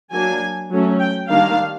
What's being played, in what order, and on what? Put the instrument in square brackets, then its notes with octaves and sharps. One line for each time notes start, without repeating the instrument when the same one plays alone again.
[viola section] F#3 A#3 D4 G#5
F#3 A3 C#4
G5
D#3 G3 A#3 D4 F5